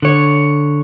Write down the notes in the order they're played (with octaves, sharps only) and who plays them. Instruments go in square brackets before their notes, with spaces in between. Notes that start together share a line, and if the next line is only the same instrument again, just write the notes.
[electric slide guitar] D3 C#5